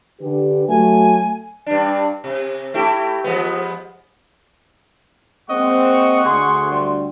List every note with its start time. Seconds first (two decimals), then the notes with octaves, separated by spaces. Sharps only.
0.21 D3 G4 B4
0.69 F#3 A3 F#4 G#5
1.66 G2 D4
2.24 C3
2.74 A3 E4 G4
3.24 F3 G#3 B3
5.50 G#3 A#3 C4 D#5 F#5 C#6
6.25 D2 G#4 C6
6.71 G3